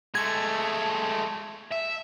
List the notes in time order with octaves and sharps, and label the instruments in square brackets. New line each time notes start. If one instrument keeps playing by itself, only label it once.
[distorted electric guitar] G#3 A3 [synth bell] G#6
[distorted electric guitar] E5